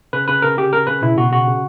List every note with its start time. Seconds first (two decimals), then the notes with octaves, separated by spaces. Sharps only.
0.13 C#3 B4
0.28 C#3 B4
0.42 C#3 A#4
0.57 C#3 G4
0.73 C#3 A#4
0.87 C#3 B4
1.02 B2 E4
1.17 B2 F#4
1.32 C#3 F#4
1.47 C#3